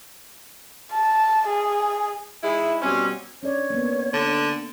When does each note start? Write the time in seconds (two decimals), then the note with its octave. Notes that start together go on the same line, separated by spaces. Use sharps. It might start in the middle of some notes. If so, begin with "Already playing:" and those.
0.92 A5
1.48 G#4
2.43 G#3 D#4 E4
2.81 B2 G3 C4 C#4
3.43 C#4 D4 C#5 D5
3.70 A#3 B3
4.13 D3